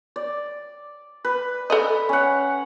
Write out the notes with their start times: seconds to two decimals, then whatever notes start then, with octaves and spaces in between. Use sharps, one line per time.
0.16 D5
1.24 B4
1.70 A4 D5 D#5
2.09 C#4 F#5